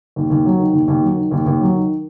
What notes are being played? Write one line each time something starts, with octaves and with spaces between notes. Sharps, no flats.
D#2
D#2
F#3
D#3
D#2
D#2
F#3
D#3
D#2
D#2
F#3
D#3